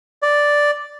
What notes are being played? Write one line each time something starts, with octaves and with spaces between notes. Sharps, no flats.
D5